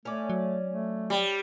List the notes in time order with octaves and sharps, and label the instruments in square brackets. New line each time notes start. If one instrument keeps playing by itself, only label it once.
[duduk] A3 [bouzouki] C#4 D5
[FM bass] F#3
[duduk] A3
[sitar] G3